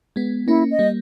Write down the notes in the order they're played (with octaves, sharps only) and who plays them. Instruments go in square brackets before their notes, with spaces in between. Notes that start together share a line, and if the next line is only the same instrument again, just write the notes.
[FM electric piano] G#3 B3
[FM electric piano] A#3 C#4 [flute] E4
[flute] D#5
[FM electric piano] G3 A#3